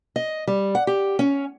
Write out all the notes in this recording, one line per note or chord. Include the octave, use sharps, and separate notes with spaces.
D#5
G3
F#5
G4
C#4